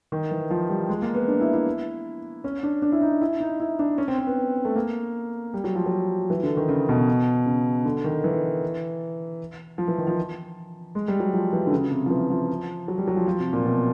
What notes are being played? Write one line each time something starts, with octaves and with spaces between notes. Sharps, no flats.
D#3
E3
F3
G3
G#3
A#3
B3
D4
E4
E4
C#4
D4
D4
E4
D#4
E4
D#4
E4
D4
C#4
C4
C4
B3
A3
A#3
G3
F#3
F3
F#3
E3
D3
D#3
C#3
B2
C#3
D3
D#3
E3
F3
E3
D#3
F3
G#3
G3
F#3
F3
E3
D3
C#3
C3
F3
E3
F3
F#3
G3
F#3
F3
F3
C3
A#2
B2